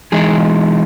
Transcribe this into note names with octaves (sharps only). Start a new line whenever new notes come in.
E3 G#3 D#4 G#4